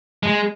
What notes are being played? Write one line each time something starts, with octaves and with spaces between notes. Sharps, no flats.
G#3